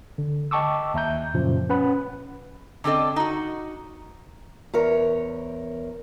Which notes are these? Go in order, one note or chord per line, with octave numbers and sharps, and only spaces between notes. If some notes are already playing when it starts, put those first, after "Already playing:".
D3
D#5 G5 A5 C#6 D6 E6
D#2 E5 A#5 G6
F#2 A#2 C#3 F3
C#4 B4 F#5 B5
D3 C4 D4 A4 D#5
D#4 F#4
E2 A#4 C#5